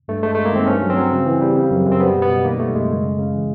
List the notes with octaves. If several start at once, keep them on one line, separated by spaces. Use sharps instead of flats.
G2 A3
G#3 A3
G#3 A3
A#3
D#3 C4
G2 C#4
F#3
C4
F#3
C#3
E3
G3
C#3
F#2
F#2
C4
G3 B3
B2
B3
B2
D#3 A#3
G3 A3
F#2 G#3
C#3
C#3
C#3
E3